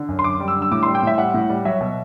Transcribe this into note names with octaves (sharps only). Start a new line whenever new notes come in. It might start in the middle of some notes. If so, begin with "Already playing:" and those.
Already playing: D3
F#2
C6
F#2 D6
G3
E6
D3
E6
A2 D6
G3 C6
G5
A2 E5
G3 F#5
A2
G3
F#3 E5
B2